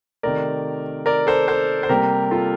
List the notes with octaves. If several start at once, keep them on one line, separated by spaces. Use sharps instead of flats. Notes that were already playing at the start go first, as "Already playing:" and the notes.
C3 D#3 A3 A#4 D5
A#4 D5
A4 C5
A4 C5
C5
C3 G3 A#3 G4 A#4
F4 A4